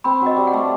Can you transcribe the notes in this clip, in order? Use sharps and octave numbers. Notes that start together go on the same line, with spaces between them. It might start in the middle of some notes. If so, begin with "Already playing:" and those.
C4 B5
F#3 D#5
G3
F#5
A3